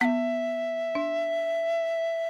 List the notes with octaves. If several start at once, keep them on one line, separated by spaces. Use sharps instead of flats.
B3 E5 F#5
D4